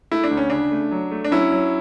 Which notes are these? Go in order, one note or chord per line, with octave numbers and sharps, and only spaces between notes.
A3 E4
D4
D2
C#4
C#3 D4
A3
F#3
A3
D4
F#3 C#4 E4
F#3